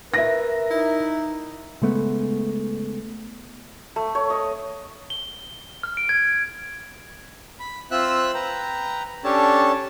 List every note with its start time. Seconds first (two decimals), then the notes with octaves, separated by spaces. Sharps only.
0.14 A#4 B4 E5 A#6
0.71 D#4 E4
1.82 C#3 G#3 A3 B3
3.96 A3
4.15 C#5
4.30 D#5
5.10 G7
5.83 F6
5.97 D7
6.09 G#6
7.60 B5
7.91 C4 F4 E5 E6 F#6
8.34 B4 G5 A#5
9.24 C#4 D4 G4 A4 C#5 A5